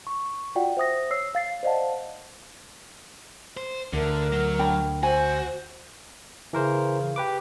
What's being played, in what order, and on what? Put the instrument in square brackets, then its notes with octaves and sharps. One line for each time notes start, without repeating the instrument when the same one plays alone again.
[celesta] C#6
F4 F#4 D5 F#5 G5
C5 E5 D#6 A#6
C#5 E6 C7
F5 A6 C7
C5 D5 D#5 F5 F#5 A5
[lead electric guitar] C5
[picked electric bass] D2 [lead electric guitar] D3 [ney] A#4
[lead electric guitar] F#3
[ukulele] D4 G5 B5
[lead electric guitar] F#4 [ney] C5 [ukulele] G#5
[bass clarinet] C#3 [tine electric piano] E3 A#4 C5
[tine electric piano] G4 B4 D6